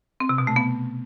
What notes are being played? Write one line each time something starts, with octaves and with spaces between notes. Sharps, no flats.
C4
C3
B2
A3
B3